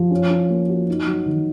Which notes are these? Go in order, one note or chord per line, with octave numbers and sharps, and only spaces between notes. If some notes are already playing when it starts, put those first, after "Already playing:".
Already playing: F3
C#4
C#4
A#3
F#4
D#4
F#3
D#3